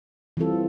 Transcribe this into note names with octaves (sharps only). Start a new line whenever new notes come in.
E3 G3 C4 F4 A4